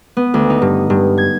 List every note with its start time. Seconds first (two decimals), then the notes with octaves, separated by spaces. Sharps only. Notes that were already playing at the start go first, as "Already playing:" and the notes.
0.17 B3
0.34 D2
0.50 D#4
0.62 G2
0.90 G2
1.18 G#6